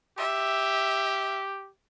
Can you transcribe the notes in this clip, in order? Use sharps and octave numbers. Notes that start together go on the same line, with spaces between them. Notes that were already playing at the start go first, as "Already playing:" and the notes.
G4 E5